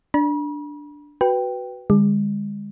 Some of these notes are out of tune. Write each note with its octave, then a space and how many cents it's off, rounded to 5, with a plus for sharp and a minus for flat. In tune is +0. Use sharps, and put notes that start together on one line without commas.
D4 +0 B5 -45
F#4 +5 B4 +0 G5 +0
D3 +0 G#3 -40